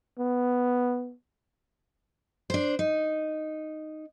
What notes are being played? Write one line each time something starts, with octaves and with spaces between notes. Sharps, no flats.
B3
D4 C5
D#4